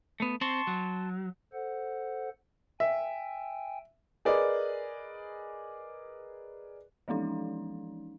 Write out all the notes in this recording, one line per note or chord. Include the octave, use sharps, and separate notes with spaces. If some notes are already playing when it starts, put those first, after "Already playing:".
A3 B3
C4 A5 C6 C#6
F#3
A4 C5 F#5
E5 G5 G#5
G#4 A#4 B4 D5 D#5
E3 F3 G#3 C#4 D#4